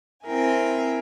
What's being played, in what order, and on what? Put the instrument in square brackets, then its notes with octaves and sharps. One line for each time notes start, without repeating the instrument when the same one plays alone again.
[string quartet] C4 E4 A#4 G5 G#5